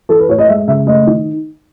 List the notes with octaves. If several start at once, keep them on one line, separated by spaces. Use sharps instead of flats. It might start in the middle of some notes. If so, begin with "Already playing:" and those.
E3 A4
B4
A2 C#5
D#5
G#3 E5
C#3 E5
A3 D#5
D#3